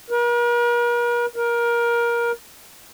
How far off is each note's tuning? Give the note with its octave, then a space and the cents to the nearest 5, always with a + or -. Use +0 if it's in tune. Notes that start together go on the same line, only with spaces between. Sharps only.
A#4 +45
A#4 +20